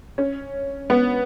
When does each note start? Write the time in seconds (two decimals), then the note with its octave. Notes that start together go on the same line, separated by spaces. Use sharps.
0.18 C#4
0.90 B3